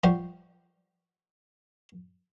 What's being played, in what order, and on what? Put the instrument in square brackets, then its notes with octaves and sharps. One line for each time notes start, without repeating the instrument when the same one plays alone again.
[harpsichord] F3 G3 F4 F#4 C5